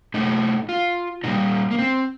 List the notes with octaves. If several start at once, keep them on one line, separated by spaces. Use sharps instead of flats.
A2 A3 D#4
F4
A#2 G3 D#4
A#3
C4